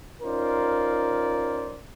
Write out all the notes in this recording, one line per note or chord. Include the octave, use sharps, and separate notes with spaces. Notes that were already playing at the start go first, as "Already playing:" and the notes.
C#4 D#4 F4 A#4 C5 D5